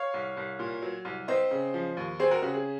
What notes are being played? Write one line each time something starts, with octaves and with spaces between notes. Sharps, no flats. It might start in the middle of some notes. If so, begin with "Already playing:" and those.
Already playing: C#5 F5
C2
C2
A#2
F#3
C2
C4 C5 D#5
C#3
F3
D#2
C4 G#4 C5
F#4 A#4
C#3 F#4
G#4